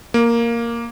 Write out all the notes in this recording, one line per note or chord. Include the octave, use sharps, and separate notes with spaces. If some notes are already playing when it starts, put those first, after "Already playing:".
A#3